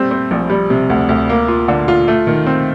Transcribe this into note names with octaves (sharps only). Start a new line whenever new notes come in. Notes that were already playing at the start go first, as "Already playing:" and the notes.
Already playing: G3 A3 C4
C4
A#1
G3
C3
D2
D2
A#3
F4
D3
F4
A3
D#3
C4